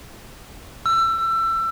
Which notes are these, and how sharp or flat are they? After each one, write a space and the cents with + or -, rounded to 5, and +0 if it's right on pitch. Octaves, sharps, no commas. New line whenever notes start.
E6 +25